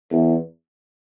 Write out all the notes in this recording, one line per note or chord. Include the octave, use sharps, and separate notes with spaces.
E2